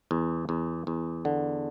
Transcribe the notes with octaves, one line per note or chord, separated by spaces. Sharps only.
E2
E2
E2
D3